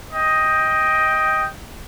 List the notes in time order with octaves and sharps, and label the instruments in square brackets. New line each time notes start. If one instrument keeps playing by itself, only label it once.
[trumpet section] D#5 G5